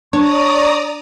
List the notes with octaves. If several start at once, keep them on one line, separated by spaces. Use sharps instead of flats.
D4 C#5 D5 A#5 C#6 D#6